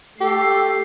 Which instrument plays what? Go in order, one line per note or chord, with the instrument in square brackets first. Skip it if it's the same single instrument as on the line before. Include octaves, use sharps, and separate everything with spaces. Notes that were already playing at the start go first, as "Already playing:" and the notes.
[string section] A3 C7 [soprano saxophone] G4 [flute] A4